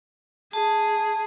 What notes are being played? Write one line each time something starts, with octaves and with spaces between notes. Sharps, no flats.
G#4 A5